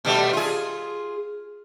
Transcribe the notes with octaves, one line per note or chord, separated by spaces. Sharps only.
B2 G3 A3
F4 G#4